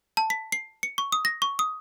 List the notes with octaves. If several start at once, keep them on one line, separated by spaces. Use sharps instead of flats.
A5
B6
C7
C#7
C#6
D#6
A#6
C#6
D#6